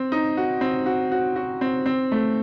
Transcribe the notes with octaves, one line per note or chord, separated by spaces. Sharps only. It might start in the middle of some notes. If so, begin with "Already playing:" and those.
Already playing: C4
D#4
F#4
C4
F#4
F#4
F#4
C4
C4
A3